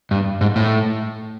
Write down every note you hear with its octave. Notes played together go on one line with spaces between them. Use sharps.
G2
G#2
A2